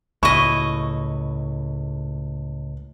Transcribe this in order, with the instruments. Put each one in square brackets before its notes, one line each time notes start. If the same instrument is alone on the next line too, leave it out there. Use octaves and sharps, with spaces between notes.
[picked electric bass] C#2 A2 [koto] E4 D#5 [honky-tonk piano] C#6